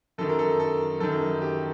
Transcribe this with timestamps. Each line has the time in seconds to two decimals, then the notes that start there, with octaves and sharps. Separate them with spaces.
0.18 F#2 D#3 A4
0.29 A#4
0.39 A4
0.60 A4
1.00 F#2 D#3 A4
1.42 G4